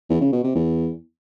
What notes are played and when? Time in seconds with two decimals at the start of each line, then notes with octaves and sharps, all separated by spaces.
0.10 E2
0.21 C#3
0.33 B2
0.44 C3
0.55 E2